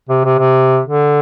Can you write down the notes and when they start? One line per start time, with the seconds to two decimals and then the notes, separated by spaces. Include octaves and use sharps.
0.09 C3
0.24 C3
0.39 C3
0.85 D3